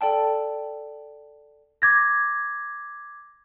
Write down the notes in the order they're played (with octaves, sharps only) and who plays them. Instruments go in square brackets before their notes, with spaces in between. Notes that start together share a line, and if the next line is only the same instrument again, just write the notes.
[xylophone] A4 D5 G5 A5
[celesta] D6 G#6 A#6